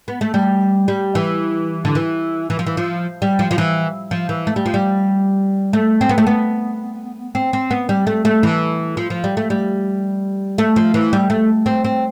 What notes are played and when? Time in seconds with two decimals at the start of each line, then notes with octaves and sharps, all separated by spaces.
0.08 B3
0.21 A3
0.34 G3
0.88 G3
1.15 E3
1.85 D3
1.95 E3
2.50 E3
2.59 F3
2.67 E3
2.77 F3
3.22 G3
3.39 F3
3.51 F3
3.58 E3
4.11 F3
4.29 E3
4.47 A3
4.56 G3
4.66 F3
4.74 G3
5.73 A3
6.01 C4
6.09 B3
6.18 A3
6.27 B3
7.35 C4
7.53 C4
7.71 B3
7.89 G3
8.07 A3
8.25 A3
8.43 E3
8.97 F3
9.10 F3
9.24 G3
9.37 A3
9.50 G3
10.58 A3
10.76 F3
10.94 E3
11.13 G3
11.30 A3
11.66 C4
11.85 C4